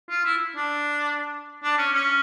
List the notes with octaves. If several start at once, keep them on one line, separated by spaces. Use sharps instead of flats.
F4
E4
D4
D4
C#4
C#4